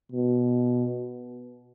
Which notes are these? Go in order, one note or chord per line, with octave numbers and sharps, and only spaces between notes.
B2